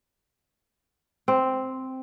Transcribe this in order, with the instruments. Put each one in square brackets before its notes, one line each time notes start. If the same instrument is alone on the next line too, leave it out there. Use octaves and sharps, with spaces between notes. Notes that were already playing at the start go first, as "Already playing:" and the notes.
[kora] C4